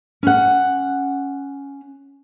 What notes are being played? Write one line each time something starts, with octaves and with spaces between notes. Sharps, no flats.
C#4 F#5